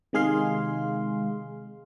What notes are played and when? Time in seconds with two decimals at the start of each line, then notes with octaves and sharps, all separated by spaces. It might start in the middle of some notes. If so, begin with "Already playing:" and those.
0.13 C3 D#3 G#3 G#4 F5 C6